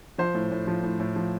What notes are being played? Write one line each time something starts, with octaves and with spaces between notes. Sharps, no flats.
F3 C5
A2
A2
F3
A2
A2
F3